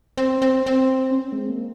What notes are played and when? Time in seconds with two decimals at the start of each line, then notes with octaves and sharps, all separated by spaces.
0.18 C4
0.42 C4
0.66 C4
1.11 C#4
1.16 C4
1.32 G#3
1.49 A#3